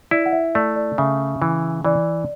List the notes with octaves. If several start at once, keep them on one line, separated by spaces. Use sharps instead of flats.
E4 D5
F#5
E5
A3 D5
D5
C#3 E5
E3
E3 D5